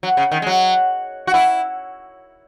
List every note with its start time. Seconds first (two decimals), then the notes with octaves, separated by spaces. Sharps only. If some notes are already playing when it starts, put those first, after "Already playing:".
0.03 F#3
0.17 C#3
0.32 D#3
0.42 G#3
0.47 F#3
1.27 F#4
1.34 E4